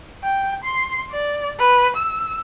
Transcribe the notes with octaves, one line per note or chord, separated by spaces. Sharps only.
G5
C6
D5
B4
E6